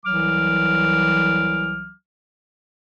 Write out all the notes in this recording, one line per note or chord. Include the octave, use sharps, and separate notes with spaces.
C2 E3 F#3 D6 F6